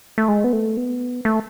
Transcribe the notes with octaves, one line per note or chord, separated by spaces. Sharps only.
A3
G#3
B3
A3
B3
A3